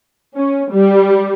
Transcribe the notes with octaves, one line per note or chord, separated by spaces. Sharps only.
C#4
G3